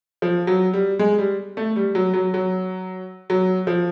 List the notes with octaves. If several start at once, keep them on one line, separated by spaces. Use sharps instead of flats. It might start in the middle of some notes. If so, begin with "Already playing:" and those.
F3
F#3
G3
G#3
G3
A3
G3
F#3
F#3
F#3
F#3
F3